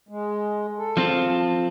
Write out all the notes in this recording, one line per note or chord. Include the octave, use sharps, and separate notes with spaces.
G#3
A4
F3 C4 F4